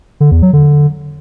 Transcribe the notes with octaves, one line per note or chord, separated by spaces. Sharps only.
D3
E2
F#3
D3